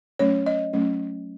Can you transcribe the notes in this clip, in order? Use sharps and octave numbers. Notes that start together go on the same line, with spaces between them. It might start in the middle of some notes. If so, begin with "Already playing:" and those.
F#3 A3 C#4 C#5
D#5
F#3 A3 C#4